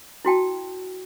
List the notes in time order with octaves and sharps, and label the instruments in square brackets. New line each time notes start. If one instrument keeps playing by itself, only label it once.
[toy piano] E4 F#4 G5 A5